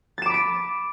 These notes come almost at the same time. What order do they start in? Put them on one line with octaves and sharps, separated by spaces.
A6 E7 D6 B5 D7